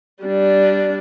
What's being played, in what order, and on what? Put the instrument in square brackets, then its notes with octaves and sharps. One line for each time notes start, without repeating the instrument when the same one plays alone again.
[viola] G3 D4